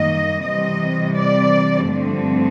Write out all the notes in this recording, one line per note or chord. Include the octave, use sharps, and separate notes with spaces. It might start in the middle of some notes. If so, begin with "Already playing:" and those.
Already playing: F#2 D#3 G3 A#3 D#5
C3 E3 G3 C4 D#5
D5
G2 D3 F3 A3 C4